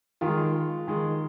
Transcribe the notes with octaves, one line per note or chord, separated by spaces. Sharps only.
D#3 G#3 F4
D#3 G#3